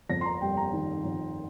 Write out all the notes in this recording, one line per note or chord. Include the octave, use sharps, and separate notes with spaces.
F2 A#6
C6
A#5
G3 G5
A#5
D#3
F2